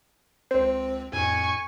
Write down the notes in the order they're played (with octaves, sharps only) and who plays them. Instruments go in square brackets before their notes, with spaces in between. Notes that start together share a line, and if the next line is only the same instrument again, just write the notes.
[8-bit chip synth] C#2 C4 [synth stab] C5
[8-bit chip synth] F2 A2 [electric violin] G#5 C#6